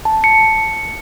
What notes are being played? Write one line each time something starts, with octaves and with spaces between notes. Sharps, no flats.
A5
C#7